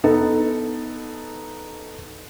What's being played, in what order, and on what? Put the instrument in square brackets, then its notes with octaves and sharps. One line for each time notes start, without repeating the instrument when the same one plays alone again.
[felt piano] B3 D#4 A4